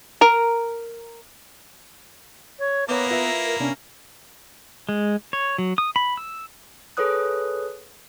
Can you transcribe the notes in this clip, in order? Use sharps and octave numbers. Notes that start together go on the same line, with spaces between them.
A#4 A#5
C#5
A#3 B3 E4 C#5 A#5 D6
F4 B4 E5
A#4
C3 B3 C#4 D4
G#3
C#5
F#3
D#6
B5
E6
G#4 A4 B4 C#5 D#6 F#6